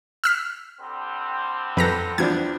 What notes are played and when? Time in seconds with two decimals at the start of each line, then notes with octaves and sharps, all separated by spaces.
0.24 E6 F6 B6
0.80 D3 G3 C4
1.77 F2 A4 B4 A#5 A#6
2.18 E2 F3 D4 G#6